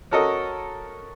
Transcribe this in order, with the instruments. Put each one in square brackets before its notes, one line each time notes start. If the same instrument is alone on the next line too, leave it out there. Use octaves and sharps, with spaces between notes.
[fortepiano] C#4 F#4 A4 A#4 D#5